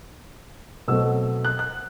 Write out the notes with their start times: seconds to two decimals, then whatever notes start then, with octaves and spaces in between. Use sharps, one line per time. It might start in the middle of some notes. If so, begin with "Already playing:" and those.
0.88 B2 F#3 A3 C4 E6
1.45 F#6
1.59 F#6